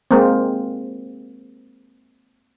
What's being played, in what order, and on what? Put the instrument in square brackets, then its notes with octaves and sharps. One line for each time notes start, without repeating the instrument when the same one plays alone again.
[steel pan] G#3 A#3 C4